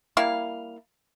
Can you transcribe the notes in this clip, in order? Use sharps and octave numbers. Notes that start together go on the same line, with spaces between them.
G3 A#3 E4 F5